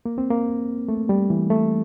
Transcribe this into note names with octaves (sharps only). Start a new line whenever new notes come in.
A#3
C4
A#3
A3
G3
E3
A3